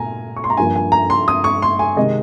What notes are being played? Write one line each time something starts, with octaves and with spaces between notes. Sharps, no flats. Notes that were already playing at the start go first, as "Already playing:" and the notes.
Already playing: A#2 G#5 A#5
C#6
C6
A#5
G2 F3 A#3 G#5
G#5
A#5
C6
D#6
C#6
C6
G#5
C3 D#3 G#3 D#5